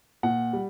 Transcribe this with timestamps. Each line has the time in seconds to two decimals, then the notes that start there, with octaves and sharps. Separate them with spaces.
0.23 A#2 F#5
0.53 G3